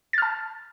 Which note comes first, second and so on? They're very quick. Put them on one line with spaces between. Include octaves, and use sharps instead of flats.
A6 F6 A5